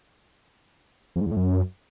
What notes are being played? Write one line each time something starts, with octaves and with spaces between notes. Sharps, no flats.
F2
G#2
E2
A2
F#2